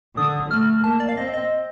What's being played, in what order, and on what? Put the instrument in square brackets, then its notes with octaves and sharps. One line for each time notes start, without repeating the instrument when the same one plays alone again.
[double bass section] D3 [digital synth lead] D#6
[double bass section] A3 [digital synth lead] F6
[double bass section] A#3 [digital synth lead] A5
[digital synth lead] D5
F5
[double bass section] C4 [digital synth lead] D#5
[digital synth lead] D#5